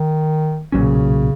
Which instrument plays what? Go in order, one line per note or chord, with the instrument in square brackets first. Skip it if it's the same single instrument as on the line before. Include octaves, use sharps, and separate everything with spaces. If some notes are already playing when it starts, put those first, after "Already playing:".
Already playing: [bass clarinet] D#3
[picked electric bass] B1 A#2 F#3 C#4 [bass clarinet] C#3